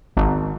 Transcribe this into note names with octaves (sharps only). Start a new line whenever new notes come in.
G#1